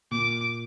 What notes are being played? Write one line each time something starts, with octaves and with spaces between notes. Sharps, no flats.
A#2 D6